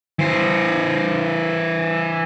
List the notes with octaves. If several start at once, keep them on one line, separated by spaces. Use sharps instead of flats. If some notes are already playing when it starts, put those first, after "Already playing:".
E3 C5